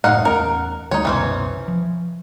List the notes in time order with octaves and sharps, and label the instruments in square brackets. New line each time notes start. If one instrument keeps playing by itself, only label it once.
[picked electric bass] F#1 A2 A3 [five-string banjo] D#4 F5 F#5
[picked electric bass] E2 A3 C#4 [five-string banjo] A#4
[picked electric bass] D2 G3 A3 [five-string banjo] D#4 C#5
[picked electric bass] F#1 C2 B2 [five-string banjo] E3 C#4 C5
[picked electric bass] F3